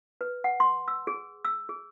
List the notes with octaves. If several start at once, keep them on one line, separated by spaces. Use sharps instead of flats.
B4
F#5
C6
E6
G#4
E6
G#4